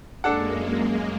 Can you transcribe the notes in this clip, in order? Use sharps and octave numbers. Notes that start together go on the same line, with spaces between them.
F#2 G#3 A#3 D4 A4 F#5